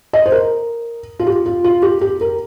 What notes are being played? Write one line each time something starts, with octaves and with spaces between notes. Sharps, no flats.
D#5
C5
A#4
F4
G4
F4
F4
G4
G4
A#4